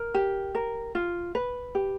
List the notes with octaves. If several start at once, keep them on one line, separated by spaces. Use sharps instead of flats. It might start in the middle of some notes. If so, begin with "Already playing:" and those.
Already playing: A#4
G4
A#4
F4
B4
G4